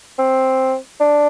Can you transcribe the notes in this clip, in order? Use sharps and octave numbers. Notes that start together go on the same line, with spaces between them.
C4
D4